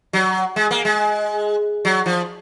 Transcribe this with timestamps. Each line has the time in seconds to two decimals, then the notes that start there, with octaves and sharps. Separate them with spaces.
0.13 F#3
0.56 G#3
0.71 A#3
0.85 G#3
1.85 F#3
2.06 F3